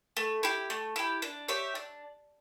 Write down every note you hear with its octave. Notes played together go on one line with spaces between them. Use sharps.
A3
E4 G4
A3
E4 G4
D4
G4 C#5 E5
D4